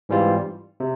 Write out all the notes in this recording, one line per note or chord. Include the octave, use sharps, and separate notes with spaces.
G#2 E3 G3 C4 F4
C3